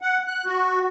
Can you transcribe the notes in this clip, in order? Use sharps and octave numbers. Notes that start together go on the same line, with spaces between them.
F#5
F#6
F#4